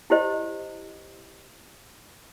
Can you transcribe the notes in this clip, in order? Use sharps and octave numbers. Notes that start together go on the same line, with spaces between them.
E4 G4 C5 D#5